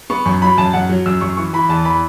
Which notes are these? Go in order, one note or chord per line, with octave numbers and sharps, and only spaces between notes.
B3 C#6
F#2 C#6
F#3 B5
F#2 A5
F#2 F#5
F#3
F#2 E6
F#2 C#6
E3 C#6
E3 B5
E2 A5
E3 B5